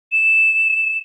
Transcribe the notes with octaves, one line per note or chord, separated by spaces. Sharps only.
E7